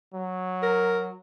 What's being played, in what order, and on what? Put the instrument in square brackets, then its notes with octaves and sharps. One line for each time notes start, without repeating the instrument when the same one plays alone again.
[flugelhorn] F#3
[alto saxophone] A#4